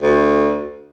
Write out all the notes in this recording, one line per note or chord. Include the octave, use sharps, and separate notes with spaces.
D2